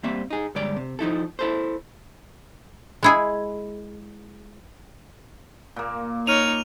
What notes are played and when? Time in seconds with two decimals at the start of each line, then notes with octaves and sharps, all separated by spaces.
0.04 G3 A#3 C4 E5
0.31 D#4 G#4
0.55 G2 D3 G#3 C#5 D5
0.76 C3
0.99 F3 D#4 E4 A4
1.39 E4 A4 C5
3.03 G#3 E4 G#4
5.76 A#2 A#3
6.27 D#4 C#5 F6 D#7 F7